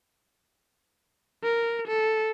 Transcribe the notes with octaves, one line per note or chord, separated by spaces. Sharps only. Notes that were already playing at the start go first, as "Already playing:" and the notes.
A#4
A4